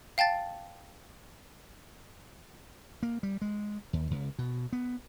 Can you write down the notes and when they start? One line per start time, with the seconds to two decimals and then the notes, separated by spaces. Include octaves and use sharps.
0.18 F5 G5 A5 A6
3.03 A#3
3.23 G3
3.42 G#3
3.93 D#2
4.11 C#2
4.39 B2
4.73 B3